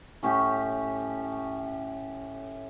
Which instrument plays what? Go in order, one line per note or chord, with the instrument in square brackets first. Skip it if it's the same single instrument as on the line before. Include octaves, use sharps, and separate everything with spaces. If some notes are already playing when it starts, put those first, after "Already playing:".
[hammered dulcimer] A2 C#4 G4